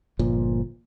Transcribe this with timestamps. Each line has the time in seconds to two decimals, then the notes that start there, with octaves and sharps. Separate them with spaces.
0.19 G1 A#2 F3